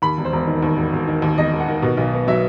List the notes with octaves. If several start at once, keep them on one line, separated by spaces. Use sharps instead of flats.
D#2 B5
E1
C5
E1
D#3
D#2
E1
E1
D#3
D#2
E1 D#5
E1
F#5
D#3
B2
B1
B3
F#3 E5